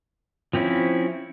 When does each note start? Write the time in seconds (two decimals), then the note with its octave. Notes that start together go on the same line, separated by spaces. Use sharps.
0.53 F3 C4 C#4 E4